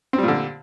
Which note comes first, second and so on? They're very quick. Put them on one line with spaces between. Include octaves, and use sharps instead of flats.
C4 G3 A#2 D3